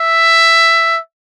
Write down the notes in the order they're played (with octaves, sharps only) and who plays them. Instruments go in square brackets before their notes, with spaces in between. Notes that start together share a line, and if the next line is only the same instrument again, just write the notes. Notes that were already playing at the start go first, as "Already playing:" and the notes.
Already playing: [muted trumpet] E5